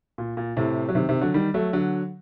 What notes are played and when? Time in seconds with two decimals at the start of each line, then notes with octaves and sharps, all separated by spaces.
0.18 A#2
0.37 A#2
0.57 A2 C3
0.89 F#3
0.95 C3 D#3
1.09 C3 D#3
1.21 D3 F#3
1.34 D#3 G3
1.54 F#3 A3
1.73 D3 F#3